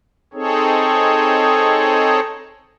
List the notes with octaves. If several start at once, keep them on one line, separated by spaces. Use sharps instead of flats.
C4 D#4 G#4 A4 C#5